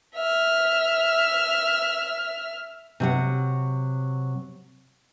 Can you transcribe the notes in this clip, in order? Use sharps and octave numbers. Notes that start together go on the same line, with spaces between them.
E5 F6
C3 F#3 F#5